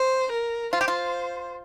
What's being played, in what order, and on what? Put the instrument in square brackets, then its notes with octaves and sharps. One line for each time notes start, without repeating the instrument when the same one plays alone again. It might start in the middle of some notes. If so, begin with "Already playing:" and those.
Already playing: [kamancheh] C5
A#4
[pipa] F4 [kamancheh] C5
[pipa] G4
F4